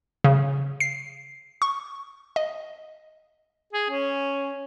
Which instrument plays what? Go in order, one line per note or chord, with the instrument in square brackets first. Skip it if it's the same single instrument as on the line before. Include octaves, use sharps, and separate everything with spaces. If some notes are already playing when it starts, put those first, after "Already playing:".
[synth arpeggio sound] C#3
C7
C#6
D#5
[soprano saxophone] G#4
C#4